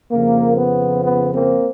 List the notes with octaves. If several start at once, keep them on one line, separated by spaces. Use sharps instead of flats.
F2 C#3 F3 A#3
B3
B3
A#3 C4